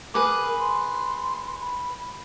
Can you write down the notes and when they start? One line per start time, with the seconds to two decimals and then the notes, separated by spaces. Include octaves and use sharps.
0.14 G#4 A#4 B4 D6
0.59 C6
1.60 B5